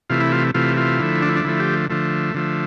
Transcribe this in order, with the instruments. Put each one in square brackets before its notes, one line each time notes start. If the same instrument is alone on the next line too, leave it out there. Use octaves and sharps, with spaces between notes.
[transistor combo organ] C3 E3 A3 F4
E4
F4
C3 E3 A3 F4
F4
D3 F3 A3 E4
D4
E4
D4
D3 F3 A3 E4
G4
D3 F3 A3
D3 F3 A3